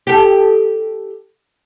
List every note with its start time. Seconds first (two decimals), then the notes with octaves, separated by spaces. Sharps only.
0.07 G4 A4